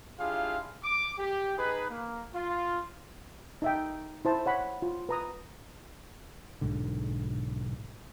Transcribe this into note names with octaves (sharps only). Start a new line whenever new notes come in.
D4 E4 F4 G4 G#4 F5
D6
G4
D#4 G#4 B4
A#3
F4
D#4 E5 G5
E4 C5 A5
C#5 F#5 B5
F4
B4 A#5 D#6
B1 G#2 D3